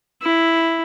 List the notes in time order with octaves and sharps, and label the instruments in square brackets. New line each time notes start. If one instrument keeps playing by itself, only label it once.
[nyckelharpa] E4